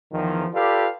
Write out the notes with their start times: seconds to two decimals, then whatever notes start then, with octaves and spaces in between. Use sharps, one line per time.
0.13 E2 D#3 F3
0.53 F4 G4 A4 B4 D5 F5